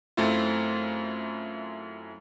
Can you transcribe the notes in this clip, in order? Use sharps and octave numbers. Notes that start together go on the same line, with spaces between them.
F#2 A3 C4 E4 F4